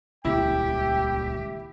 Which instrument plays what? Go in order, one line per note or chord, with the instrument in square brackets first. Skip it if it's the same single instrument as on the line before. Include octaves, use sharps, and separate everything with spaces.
[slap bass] D#1 C#2 [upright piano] E4 [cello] G4 [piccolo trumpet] G5